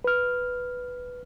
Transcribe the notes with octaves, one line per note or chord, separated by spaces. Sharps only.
B4 F6